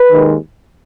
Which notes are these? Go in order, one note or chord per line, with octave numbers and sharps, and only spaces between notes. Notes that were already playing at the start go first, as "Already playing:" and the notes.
Already playing: B4
D#2 D#3 G#3